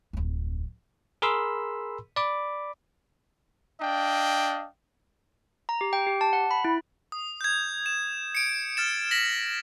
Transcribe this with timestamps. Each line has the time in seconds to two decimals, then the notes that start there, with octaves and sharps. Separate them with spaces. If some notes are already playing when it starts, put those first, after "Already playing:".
0.13 D1 F2
1.22 G#4 A#4 B5 C6 E6
2.16 D5 B5 D6
3.81 D4 D#5 F5 G5
5.69 A#5
5.81 G4
5.93 G5
6.07 G4
6.21 A5
6.33 F#5
6.51 B5
6.65 E4
7.12 D#6
7.41 G6 G#6
7.86 E7
8.35 C#7 D7
8.77 F6 A6 E7
9.11 A#6 B6 F#7